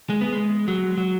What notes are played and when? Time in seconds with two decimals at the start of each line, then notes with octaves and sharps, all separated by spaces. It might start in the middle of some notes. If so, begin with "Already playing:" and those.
0.10 G#3
0.21 B3
0.33 G#3
0.68 F#3
0.98 F#3